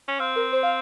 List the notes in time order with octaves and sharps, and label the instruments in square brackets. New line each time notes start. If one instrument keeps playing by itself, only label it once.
[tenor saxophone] C#4
[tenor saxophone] C4 [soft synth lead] F5
[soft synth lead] A#4
C5
F5